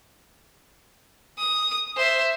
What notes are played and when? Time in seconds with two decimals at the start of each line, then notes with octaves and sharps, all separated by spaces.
1.38 D#6
1.97 C5 E5